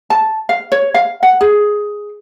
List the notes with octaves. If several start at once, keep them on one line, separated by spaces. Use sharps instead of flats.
A5
F5
C#5
F5
F#5
G#4